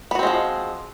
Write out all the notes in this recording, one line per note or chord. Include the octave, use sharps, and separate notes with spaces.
F3 G#3 B3 C4 F#4